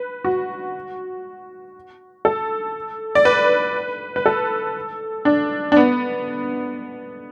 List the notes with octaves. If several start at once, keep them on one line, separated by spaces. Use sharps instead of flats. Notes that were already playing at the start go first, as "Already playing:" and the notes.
Already playing: B4
F#4
A4
D5
B4
B4
A4
D4
D4
B3